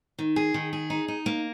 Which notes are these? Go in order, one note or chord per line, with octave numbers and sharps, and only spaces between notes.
D#3
G#4
D#3
G#4
D#4
D#4
A#3